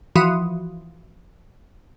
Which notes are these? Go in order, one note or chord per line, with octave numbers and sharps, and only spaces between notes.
E3 F3 F#4 D#6